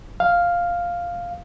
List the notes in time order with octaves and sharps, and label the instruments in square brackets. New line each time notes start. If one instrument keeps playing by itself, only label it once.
[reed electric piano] F5